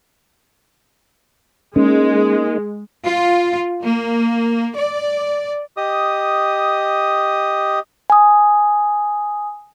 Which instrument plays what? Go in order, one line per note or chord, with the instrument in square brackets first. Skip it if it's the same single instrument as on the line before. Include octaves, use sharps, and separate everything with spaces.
[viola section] G#3 [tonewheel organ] A#3 D#4 [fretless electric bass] C#4
[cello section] F4
A#3
D5
[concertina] G4 D#5 D#6
[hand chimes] G#5 D#6